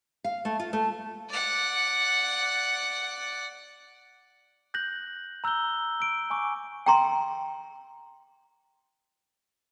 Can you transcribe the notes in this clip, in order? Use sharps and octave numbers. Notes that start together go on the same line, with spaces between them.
F5
A3
F4
A3
D5 F#5
F#6 G6 A#6 F#7
A#5 E6 F#6 G6 G7
E6 D7
G#5 C#6 D6
G5 A#5 C6